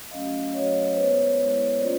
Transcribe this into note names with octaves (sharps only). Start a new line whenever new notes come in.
F#3 A3 C#4 F#4 D#5 F5
F#3 A3 C#4 F#4 C#5 D#5
C5
G#3 B3 E4 B4 C#5
G#3 B3 E4
A#3 C#4 F4 C5 D5